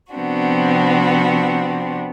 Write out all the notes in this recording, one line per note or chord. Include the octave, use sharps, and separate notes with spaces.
C3 F3 B3 C4 D4 F#4